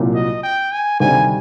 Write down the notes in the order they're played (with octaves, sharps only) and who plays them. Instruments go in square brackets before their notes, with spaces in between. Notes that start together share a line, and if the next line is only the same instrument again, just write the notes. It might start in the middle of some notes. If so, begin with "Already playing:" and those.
Already playing: [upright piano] C2 A#2 F#3 A#3
[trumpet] D#5
G5
G#5
[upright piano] D2 C3 D#3 G3 [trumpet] G#5